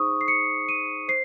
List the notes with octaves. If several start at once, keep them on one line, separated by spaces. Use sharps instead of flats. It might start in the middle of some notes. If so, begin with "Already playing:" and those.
Already playing: D#4 G#4 C5 C#6 D#6
C7
C#7
D#7
C5 C7